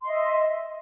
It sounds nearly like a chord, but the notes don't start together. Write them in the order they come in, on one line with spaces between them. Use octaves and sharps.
C6 D#5 E5